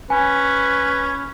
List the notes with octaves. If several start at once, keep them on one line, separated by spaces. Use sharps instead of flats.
C#4 B4 G#5